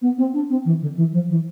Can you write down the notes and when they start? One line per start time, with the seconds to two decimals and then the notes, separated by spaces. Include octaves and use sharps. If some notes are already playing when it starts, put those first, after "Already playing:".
0.01 B3
0.17 C4
0.33 D4
0.49 C4
0.65 E3
0.81 D3
0.96 E3
1.12 F3
1.29 E3